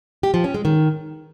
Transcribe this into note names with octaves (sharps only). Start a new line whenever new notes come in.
G4
F3
C#4
G#3
D#3